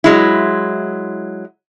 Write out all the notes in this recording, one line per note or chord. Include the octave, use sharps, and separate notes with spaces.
F#3 G#3 E4